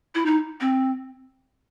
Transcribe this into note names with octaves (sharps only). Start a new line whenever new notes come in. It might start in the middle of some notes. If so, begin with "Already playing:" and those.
E4
D#4
C4